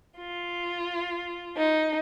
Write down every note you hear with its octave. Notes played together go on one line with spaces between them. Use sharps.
F4
D#4